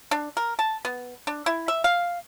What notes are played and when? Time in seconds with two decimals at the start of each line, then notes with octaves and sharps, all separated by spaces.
0.11 D4
0.37 A#4
0.59 A5
0.85 B3
1.27 D4
1.46 E4
1.68 E5
1.84 F5